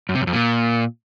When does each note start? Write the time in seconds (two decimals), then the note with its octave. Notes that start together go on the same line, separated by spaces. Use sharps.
0.09 F#2
0.15 C3
0.21 F#2
0.27 F2
0.33 A#2